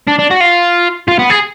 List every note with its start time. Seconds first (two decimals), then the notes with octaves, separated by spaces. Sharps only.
0.07 D4
0.19 D4
0.30 F#4
0.40 F4
1.08 F4
1.19 B3
1.30 G#4